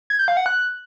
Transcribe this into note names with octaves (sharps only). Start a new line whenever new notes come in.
G#6
G6
F5
F#5
F#6